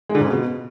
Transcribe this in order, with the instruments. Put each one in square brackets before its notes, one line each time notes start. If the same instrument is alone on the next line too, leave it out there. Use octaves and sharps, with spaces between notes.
[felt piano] G#3
D3
G#2
C#3
B2